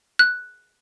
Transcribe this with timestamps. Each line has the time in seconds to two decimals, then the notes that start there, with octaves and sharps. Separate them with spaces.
0.19 F#6